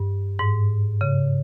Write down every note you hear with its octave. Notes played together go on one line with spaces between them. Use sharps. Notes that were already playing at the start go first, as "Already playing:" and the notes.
Already playing: G2
G#2
C#3